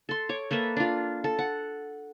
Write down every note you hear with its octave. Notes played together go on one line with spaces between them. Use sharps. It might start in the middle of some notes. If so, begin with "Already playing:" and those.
A4 C6
C#5 D6
A#3 A4 B4 E5
D4 F4
A4
F#5